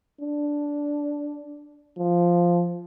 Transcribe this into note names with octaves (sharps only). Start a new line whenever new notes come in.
D4
F3